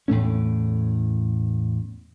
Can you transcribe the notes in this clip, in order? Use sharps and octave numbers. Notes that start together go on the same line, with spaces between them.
E2 A2 A3 C#4